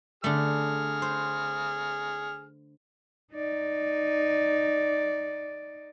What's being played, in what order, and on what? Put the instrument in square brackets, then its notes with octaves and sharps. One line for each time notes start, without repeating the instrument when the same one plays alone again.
[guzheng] D3 A3 [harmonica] G#4 F6
[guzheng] C5
[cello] D#4 D5